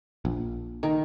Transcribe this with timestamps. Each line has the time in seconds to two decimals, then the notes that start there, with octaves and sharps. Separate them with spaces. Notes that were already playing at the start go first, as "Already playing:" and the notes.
0.25 A#1
0.83 D#3